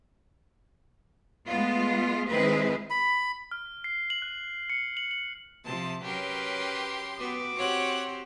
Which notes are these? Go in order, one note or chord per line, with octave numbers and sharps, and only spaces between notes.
G#3 A3 B3 F4
D#3 G#3 C4 E4 G#4 B4
B5
F6
C7
F#7
F#6
C#7
F#7
F#7
C3 F3 A5
F#3 C#4 G4 A#4 B4 C6
B3 F#4 B4 D6
C4 F#4 G4 C#5 F#5